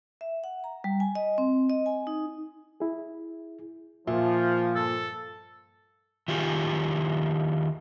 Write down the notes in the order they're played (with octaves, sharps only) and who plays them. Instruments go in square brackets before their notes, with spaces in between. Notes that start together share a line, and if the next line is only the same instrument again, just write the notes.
[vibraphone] E5
F#5
A#5
G3
G#5
D#5
C4
D#5
G#5
D#4
[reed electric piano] E4 G#4
[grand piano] A#2 [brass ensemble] F3 [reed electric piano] E5
[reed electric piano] G2 [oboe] A4
[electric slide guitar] D#3 E4 F4 G4 G#4